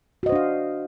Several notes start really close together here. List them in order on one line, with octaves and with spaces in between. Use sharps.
F#4 D#5 C5 D4 F5